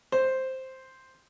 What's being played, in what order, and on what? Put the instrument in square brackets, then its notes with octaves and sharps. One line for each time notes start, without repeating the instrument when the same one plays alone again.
[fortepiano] C5